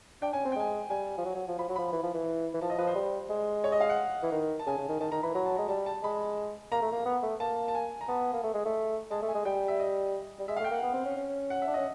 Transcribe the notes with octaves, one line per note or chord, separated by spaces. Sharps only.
D4 G5
C#4 G#5
C4 G#5
G5
G#3 G#5
G3 G#5
F3
F#3
F#3
F3
F3 B5
F#3
F3 B5
E3
F3
E3
E3
F3 A5
D#5
F3 B4
C5
G3
G#3
C#5
D#5
F5
F#5
E3
D#3
A5
C#3 G#5
C#3
D#3
D#3 A5
D#3 A#5
E3 B5
F#3 A#5
A5
G#3 A#5
G3 A5
A5
G#3 B5
A#3 A#5
A3
A#3
B3
A3
A#3 A5
A5
G#5
A#5
B3 A5
A#3
A3
G#3
A3
G#3 A5
A3
G#5
G#3
G3 G5
E5
D#5
G3
G#3 E5
F5
A3
G5
A#3 F#5
B3
C4
C#4
C#4
F#5
E5
D4
C#4 D#5